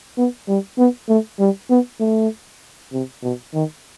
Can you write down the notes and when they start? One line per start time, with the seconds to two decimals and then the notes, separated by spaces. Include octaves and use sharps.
0.17 B3
0.48 G3
0.78 B3
1.08 A3
1.39 G3
1.70 B3
2.00 A3
2.92 C3
3.23 B2
3.54 D#3